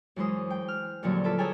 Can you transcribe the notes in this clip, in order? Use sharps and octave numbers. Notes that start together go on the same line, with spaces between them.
F#2 E3 G#3 C5 D#6
G5
F6
F2 A#2 D3 F#3 G3
F4 A4 B4 E5 D6
G#4 A4 C#5 G5 G#5 A#5